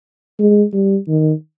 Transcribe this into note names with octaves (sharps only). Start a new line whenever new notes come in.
G#3
G3
D#3